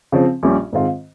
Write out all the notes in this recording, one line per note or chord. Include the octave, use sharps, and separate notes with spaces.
C#3 F3 C4
A#1 A#2 G3 C#4 G4
G#2 D#3 G#3 C4 F4